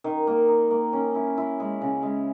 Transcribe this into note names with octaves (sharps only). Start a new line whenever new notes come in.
D#3
A#3
D#4
A#3
C#4
E4
E4
G#3
C#3
G#3